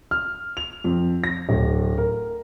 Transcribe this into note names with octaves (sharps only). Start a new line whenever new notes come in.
F6
F7
F2
A#6
D1
A#4